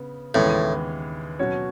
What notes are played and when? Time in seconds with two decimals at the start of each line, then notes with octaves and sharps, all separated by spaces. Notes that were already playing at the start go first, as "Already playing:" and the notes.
Already playing: C#3 B3
0.34 D#2 A2 C#3 E3 G#3 B3
1.39 B2 F#3 C#4 F#4 C#5